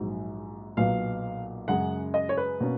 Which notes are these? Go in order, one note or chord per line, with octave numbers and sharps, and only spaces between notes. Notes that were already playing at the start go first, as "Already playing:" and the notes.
Already playing: A#1 G#2 F#3
B1 A#2 F#3 B3 F5
F#2 C#3 G#3 F#5
D#5
C#5
B4
B2 A#3 C#4